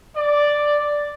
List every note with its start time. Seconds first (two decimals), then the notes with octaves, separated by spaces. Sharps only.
0.16 D5